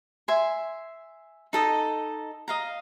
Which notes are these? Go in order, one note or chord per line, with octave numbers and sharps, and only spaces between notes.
E5 G#5 C6
D#4 A4 D#5
D#5 F5 A#5